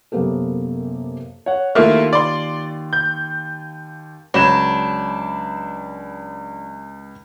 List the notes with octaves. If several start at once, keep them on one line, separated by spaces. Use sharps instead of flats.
F#2 C3 A#3 B3 G4 A4
C#5 F#5
D#2 A3 A#3 E4 F4 F6
D5 C6
G6
C#2 F#3 D4 B5 G6 G#6 E7